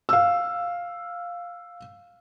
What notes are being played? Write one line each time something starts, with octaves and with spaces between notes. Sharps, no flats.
F5 E6